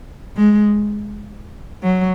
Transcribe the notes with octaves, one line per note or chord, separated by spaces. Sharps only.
G#3
F#3